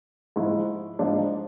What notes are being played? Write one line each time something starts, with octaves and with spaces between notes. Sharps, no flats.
G#2 F3 E4
G#2 F3 D4